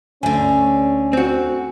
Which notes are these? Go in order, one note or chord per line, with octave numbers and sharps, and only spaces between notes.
D2 D3 C#4 G#5
C4 F#4